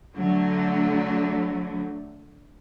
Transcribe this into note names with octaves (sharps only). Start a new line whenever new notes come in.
D3 F#3 A3